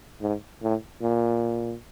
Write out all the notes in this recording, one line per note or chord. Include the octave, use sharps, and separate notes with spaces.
G#2
A2
A#2